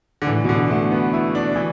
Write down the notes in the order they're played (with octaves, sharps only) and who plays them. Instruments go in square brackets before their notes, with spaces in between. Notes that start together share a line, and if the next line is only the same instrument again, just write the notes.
[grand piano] D3
[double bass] A2 [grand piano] E3
[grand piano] B2
D3
[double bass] B2
[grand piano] A3
B3
E4
D4
E3